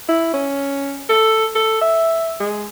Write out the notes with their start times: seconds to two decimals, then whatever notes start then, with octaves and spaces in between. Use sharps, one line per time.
0.09 E4
0.34 C#4
1.09 A4
1.55 A4
1.82 E5
2.40 G#3